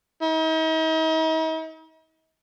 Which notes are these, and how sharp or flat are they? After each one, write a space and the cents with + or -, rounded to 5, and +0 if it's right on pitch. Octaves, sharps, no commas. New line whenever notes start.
D#4 +45